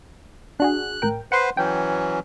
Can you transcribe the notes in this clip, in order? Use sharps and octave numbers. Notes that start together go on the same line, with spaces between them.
D4 F#4 G#4 F#6
A1 A#4 G5
B4 C5 F#5 C6
E3 F#3 C#4 G5